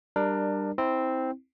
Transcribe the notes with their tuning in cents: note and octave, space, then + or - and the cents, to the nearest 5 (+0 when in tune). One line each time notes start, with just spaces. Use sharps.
G3 +5 D4 +20 A#4 +0
C4 +0 E4 -25